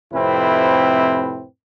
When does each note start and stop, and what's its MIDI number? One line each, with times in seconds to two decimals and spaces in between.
0.13 1.44 41
0.13 1.44 45
0.13 1.44 48
0.13 1.44 60
0.13 1.44 64
0.13 1.44 71